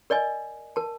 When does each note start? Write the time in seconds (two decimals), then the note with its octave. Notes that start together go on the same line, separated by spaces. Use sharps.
0.10 A#4 D5 D#5 G#5
0.76 A#4 A5